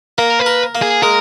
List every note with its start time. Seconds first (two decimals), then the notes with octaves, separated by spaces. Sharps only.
0.18 A#3 A#4
0.39 B4
0.46 A#4
0.75 A#3
0.82 G#4
1.03 G#3 A#4